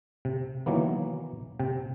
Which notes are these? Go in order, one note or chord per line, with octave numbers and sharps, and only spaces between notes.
C3
D#3 E3 F#3 A#3 B3
C3 G5